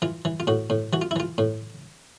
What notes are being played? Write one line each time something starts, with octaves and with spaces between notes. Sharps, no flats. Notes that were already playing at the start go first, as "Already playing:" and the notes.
E3 F4
E3
F4
A2 F#4
A2
E3 F#4
F4
E4
E3 F4
A2